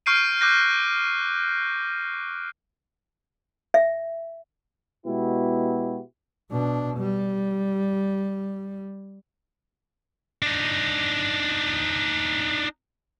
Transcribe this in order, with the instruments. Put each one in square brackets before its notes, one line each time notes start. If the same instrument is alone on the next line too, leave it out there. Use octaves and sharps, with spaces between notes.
[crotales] C#6 F6 G6 C7 D7 D#7
D6 F#6 G6 A#6
[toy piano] E5
[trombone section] B2 G#3 B3 E4 F#4 G4
[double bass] B2 D4
G3
[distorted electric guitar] D4 D#4